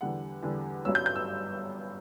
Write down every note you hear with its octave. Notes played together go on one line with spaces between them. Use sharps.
E2 D3 G3 F#5
E2 D3 G3
G1 G2 F#3 C#4 E6
G6
G6
E6